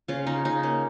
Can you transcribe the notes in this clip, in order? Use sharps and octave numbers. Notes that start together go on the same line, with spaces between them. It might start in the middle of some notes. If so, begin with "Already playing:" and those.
C#3 C#4 F4
C#3 D#4
C#3 D#4
A#3 C#4